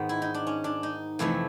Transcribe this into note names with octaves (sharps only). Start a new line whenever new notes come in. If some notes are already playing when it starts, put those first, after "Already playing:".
Already playing: G#2 D#3 G#3 B3
E4
D#4
D4
C#4
D4
D#4
F2 C3 E3 A3 E4